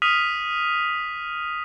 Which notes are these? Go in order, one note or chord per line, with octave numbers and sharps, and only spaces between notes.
D#6 F6 B6 D#7 F7